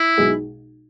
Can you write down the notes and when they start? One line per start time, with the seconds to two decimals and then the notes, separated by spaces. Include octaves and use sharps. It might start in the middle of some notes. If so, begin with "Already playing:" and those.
Already playing: E4
0.18 B1 B2 G#3 D#4 G#4